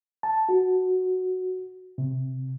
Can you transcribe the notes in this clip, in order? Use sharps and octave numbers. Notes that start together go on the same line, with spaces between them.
A5
F#4
C3